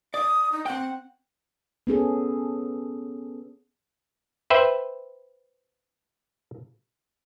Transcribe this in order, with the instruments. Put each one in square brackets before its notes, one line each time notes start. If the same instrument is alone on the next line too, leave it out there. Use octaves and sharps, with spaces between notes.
[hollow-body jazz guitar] D5 [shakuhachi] D#6
[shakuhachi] D#4
[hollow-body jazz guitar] C4 G5 [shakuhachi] F#5
[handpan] B3 C#4 G#4 A4
[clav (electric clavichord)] B4 C5 E5 G5